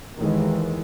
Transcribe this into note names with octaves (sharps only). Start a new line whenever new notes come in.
D#2 D#3 E3 G#3